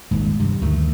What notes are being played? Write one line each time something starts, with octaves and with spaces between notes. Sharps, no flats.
D#1 G#1 G#2
G2 C3
D2 D#3 A3